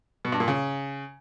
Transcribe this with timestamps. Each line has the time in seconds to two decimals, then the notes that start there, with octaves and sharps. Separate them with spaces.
0.25 B2
0.32 G2
0.40 A#2
0.48 C#3